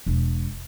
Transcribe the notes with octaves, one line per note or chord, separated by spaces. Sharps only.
E1